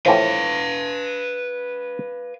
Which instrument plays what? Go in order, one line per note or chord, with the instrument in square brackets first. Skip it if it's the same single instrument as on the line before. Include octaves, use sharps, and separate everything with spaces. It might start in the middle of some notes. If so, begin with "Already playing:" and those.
[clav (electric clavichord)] A2 E3 F3 [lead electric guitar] B4 F5